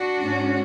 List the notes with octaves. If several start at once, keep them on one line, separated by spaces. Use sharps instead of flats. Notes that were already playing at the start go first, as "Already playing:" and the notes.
Already playing: D4 F#4
G#2 G#3 C#4